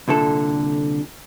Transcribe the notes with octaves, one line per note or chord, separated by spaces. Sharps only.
C2 A#2 D3 A4 A5